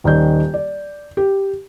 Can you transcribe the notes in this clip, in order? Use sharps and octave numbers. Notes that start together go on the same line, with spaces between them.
D#1 D#3 D5 G6
D5
G4